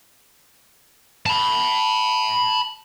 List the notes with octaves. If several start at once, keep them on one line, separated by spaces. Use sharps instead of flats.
A5 B5